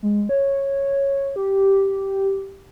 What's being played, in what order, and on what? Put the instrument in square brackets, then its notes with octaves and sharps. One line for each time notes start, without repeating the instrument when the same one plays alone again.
[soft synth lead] G#3
C#5
G4